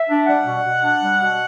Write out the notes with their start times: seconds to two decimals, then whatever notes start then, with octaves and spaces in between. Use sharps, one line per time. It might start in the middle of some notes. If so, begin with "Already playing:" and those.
Already playing: E5
0.09 D4
0.27 G3 F#5
0.45 B2
0.64 B2
0.82 D4
1.01 G3
1.19 B2